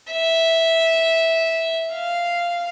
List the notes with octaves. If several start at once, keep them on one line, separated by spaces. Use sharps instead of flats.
E5
F5